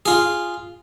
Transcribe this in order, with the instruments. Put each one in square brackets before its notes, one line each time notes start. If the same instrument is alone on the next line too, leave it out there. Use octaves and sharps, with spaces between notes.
[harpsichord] F4 G#4